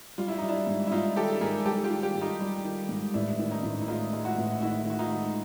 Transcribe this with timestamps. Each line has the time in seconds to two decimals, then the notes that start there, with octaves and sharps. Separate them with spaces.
0.18 G3 F4
0.28 E4
0.38 G3 D#4
0.49 D4 E4
0.67 G#2
0.87 E4
0.91 G#2 D#4 F4
1.16 D#3 G4 A4
1.41 G#2 G#4 A#4
1.65 G3 G4 A4
1.84 F4 G4
1.90 D#3
2.03 F4 G4
2.15 G#2
2.21 D#4 F4
2.41 G3
2.64 D#3
2.89 G#2
3.14 A1 D4 E4
3.39 D#3 D4
3.51 C#4 D#4
3.63 A1
3.82 E4
3.88 G#3 D#4 F4
4.13 G#3
4.25 E4 F#4
4.38 A1
4.62 D#3 E4 F#4
4.86 D#3 F#4
4.99 D#4 F4
5.11 G#3